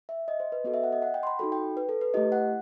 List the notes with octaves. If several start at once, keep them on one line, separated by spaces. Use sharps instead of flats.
E5
D#5
C5
B4
B3 F#4 A4 D#5
E5
F#5
D#5
F#5
G5
C6
B5
D#4 F#4 A4 B5
G5
B4
A4
B4
A3 E4 G4 D#5
F#5